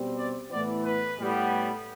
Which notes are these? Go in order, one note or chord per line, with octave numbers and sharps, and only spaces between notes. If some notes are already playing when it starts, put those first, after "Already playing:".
Already playing: B2 G3 C4
D5
A2 E3 B3 D5
B4
A2 G3 B3